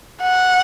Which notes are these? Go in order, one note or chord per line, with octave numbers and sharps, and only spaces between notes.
F#5